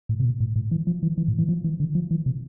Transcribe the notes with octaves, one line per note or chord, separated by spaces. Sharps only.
A2
C3
A#2
A2
A2
E3
F3
E3
E3
A2
E3
F3
E3
D3
F3
E3
C3